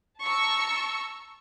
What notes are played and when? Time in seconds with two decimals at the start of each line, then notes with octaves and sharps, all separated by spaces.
0.23 A5 A#5 C#6 E6